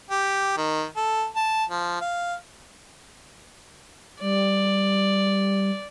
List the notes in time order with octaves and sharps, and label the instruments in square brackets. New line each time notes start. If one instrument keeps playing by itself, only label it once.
[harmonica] G4
D#3
A4
A5
F3
F5
[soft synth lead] G3 [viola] D5